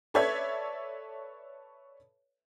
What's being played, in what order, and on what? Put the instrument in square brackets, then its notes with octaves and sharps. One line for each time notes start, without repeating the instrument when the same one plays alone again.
[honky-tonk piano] A4 B4 C#5 D5 E5 G#6